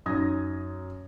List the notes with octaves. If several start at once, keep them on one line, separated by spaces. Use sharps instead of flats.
F#2 D#4 D#6 G#6 A#6